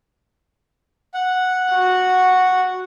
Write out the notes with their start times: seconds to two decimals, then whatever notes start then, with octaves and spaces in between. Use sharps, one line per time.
1.14 F#5
1.71 F#4